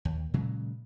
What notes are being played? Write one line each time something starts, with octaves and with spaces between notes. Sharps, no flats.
D#2
A#2 C#3 F#3 G#3